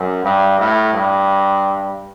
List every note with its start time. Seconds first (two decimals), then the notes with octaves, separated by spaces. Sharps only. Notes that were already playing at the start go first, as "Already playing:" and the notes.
Already playing: F#2
0.24 G2
0.59 A2
0.94 G2